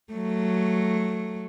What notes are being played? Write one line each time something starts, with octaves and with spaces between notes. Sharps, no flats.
F#3 A3